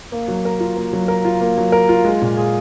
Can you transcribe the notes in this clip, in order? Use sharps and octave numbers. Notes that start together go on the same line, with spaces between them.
A#3
F#3
A#4
F4
A#3
F#3
A#4
F4
A#3
F#3
A#4
F4
G#3
A#2
G#4